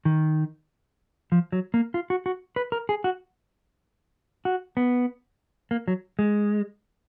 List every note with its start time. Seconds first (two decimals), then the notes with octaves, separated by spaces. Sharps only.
0.05 D#3
1.32 F3
1.52 F#3
1.74 A#3
1.94 F4
2.10 F#4
2.26 F#4
2.56 B4
2.72 A#4
2.89 G#4
3.04 F#4
4.45 F#4
4.77 B3
5.71 A#3
5.88 F#3
6.19 G#3